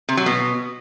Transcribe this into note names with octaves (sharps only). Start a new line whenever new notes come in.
C3
F#3
B2